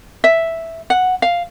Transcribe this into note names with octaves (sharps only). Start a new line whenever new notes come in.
E5
F#5
F5